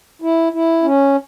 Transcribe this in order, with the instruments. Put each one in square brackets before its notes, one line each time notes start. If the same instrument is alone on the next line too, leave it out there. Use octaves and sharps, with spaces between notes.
[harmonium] E4
E4
C#4